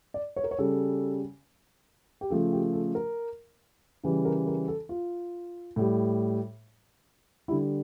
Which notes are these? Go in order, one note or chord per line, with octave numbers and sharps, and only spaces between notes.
D5
C#5
A#4
C#5
C#3 G3 A4
G4
C#3 F3 A3 A4
G4
A4
A#4
C#3 E3 G3
A#4
A#4
A4
F4
A2 G3
D3 G3 E4